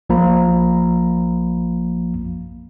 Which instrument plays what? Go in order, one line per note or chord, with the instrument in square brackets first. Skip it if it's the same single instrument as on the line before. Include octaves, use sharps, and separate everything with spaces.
[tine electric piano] A#1 F3 A#3 F5 A#5 B5